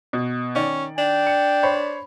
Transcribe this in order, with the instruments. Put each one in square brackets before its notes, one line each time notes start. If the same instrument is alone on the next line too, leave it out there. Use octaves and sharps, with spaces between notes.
[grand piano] B2
[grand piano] D#3 D5 [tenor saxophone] C#4
[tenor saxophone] D4 [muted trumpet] G5
[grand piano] C#7
C5 C#5 B5